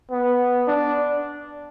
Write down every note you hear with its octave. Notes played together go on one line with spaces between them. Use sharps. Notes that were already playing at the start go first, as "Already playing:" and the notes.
B3
D4